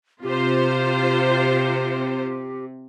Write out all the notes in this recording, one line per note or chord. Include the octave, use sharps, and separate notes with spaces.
C3 F4 G4 C5